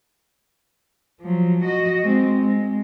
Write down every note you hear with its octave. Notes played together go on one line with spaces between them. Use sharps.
F3 F#3
F#4 D#5
G#3 C4
G#3